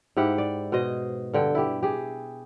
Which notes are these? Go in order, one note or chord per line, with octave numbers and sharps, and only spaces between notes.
G#2 E4 G4 F#5
D5
B2 C5 D#5
G2 D3 G5
E4 G4
G4 G#4